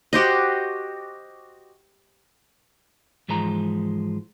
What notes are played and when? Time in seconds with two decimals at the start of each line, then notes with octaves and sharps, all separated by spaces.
0.13 F#4 G4 C5 D#5
3.29 G#2 E3 F3 G#3 A#5